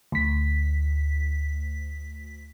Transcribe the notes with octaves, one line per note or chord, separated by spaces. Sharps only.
D2 B6